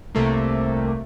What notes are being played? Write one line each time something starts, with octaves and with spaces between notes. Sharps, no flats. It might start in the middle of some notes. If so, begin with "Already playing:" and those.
C2 C3 A3 A#3